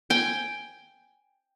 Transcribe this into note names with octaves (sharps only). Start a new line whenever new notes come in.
G5 G#5